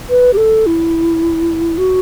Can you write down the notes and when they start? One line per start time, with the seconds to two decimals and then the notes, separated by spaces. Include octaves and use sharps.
0.10 B4
0.34 G4
0.37 A4
0.66 E4
1.78 F#4